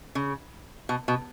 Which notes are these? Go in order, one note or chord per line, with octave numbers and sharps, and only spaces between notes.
C#3
B2
B2